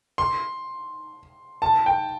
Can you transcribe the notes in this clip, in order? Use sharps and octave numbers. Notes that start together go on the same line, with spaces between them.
C6
A5
G5